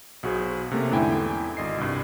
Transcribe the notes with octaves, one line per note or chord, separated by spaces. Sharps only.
B1 F#4 G#4 C5
C3 A3 A#3 C#4
E2 G#2 D3 E4 G5 G#5
G#1 D#5 C7
C2 G2